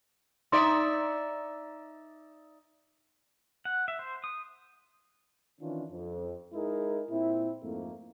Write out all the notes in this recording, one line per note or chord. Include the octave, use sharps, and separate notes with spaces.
D#4 D5 E5 C6
F#5
E5
C5
D#6
D#3 E3 C#4 D4 F4
F2
G#3 D#4 E4 G#4 A#4
A#2 C4 E4
F2 G#2 A3 A#3